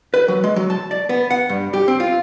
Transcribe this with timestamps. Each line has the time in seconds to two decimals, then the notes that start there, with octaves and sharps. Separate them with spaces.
0.14 B4
0.28 F#3
0.44 G#3
0.56 F#3
0.70 A5
0.91 D5
1.09 B3
1.30 F#5
1.49 G2
1.74 G4
1.88 C4
2.00 F4